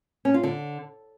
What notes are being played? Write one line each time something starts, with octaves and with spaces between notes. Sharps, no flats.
C#4
F4
D3